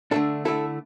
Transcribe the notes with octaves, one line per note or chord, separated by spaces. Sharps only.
D3 A3 D4 A4
D3 A3 E4 A4